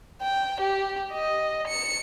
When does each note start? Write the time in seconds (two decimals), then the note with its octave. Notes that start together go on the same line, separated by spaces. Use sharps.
0.21 G5
0.60 G4
1.13 D#5
1.67 C#7